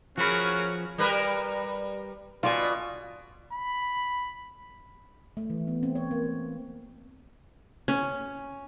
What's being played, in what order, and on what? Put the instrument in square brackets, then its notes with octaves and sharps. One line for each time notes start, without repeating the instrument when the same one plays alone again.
[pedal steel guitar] F3 B5 [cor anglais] C#4 [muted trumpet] F#4 [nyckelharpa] G#4 A#4
[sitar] G3 A#4 B4
[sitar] B2 [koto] F4 D5 G#5
[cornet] B5
[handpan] A3
E3
B3
C4
C#5
A#3
A#3
[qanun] C#4